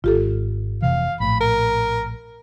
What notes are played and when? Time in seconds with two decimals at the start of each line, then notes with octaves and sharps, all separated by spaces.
0.04 G#1 F4 G4 A4
0.82 F1 C3 E3 F5
1.20 A#1 A2 B5
1.40 A#4